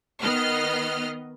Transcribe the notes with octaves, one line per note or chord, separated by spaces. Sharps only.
D#3 B3 D#5 F6 C7